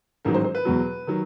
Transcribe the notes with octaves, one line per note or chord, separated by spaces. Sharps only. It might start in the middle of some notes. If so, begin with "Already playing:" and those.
A1 G#2 D#3 F#3 A#4
C5
C5
B4
E2 B2 F#3
D#3 F#3